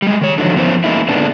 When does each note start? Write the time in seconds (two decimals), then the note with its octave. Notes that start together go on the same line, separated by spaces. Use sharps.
0.02 G3 G#3
0.21 D#3 C#5
0.38 D3 D#3 F3 F#3
0.57 F3 B3 C#4 E4 A#4 C5
0.84 E3 G#3 A#3 D#4 E4
1.09 A#2 D3 G#3 B3 D4